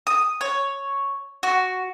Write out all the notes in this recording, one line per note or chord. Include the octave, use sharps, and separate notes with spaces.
D#6
C#5
F#4